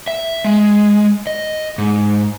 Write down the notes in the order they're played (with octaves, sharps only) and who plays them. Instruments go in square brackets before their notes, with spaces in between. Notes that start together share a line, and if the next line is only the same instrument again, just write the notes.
[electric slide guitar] E5
G#3
D#5
G#2